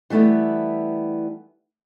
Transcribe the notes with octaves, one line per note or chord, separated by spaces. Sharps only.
E3 G3 A3 B3 E4